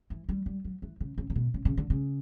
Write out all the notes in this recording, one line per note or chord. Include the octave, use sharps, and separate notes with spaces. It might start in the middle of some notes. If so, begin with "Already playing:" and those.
E3
G3
G3
F#3
E3
C#3
C#3
C#3
B2
C#3
C#3
D3
C#3